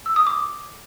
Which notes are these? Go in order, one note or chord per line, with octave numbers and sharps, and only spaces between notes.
E6
D#6
D6